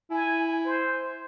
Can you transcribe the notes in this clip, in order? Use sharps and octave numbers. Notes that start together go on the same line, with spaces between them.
E4 G#5
C5